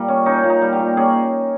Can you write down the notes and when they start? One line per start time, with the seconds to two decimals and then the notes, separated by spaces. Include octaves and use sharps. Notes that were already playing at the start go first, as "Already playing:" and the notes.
Already playing: A#2 G3
0.08 C#4
0.26 C#4 D#4
0.44 A#2
0.50 D#4
0.62 G3
0.73 G4
0.79 A#2
0.97 C#4 G#4